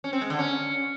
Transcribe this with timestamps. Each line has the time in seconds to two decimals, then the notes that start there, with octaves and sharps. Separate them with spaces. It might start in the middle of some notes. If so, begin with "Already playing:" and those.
0.04 C#4
0.13 C4
0.21 G#3
0.30 D3
0.39 C#4